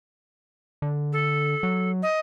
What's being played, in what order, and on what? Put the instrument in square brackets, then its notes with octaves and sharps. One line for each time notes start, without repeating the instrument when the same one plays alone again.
[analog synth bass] D3
[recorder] A4
[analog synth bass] F#3
[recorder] D#5